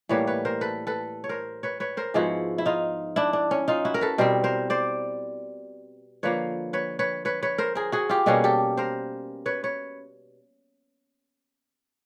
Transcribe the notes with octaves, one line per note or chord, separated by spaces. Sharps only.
A2 E3 G3 A#3 B4 C#5
B4 C#5
A#4 C5
A4 B4
A4 B4
C#5
A#4 C5
B4 C#5
B4 C#5
A#4 C5
G#2 F3 G#3 B3 E4 F#4
E4
D#4 F4
D4 E4
D4
C#4
D#4 F4
E4 F#4
A#4
A4 B4
B2 G3 C4 A#4 C5
A#4 C5
C5 D5
D3 F3 A#3 B4 C#5
B4 C#5
B4 C#5
B4 C#5
B4 C#5
A#4 C5
G#4 A#4
F#4 G#4
F4 G4
B2 G3 A#3 C#4 F#4 G#4
G4 A4
A#4 C5
B4 C#5
B4 C#5